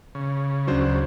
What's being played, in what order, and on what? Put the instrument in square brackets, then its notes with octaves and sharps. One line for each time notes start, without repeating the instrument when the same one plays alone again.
[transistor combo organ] C#3
[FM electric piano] D2 C#4 [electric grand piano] F#3 D4 C5